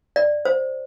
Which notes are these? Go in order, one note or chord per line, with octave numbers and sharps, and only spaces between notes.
D5
C5